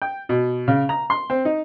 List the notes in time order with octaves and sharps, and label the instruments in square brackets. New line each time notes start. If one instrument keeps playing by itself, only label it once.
[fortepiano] G5
B2
C#3
A#5
C6
C4
D#4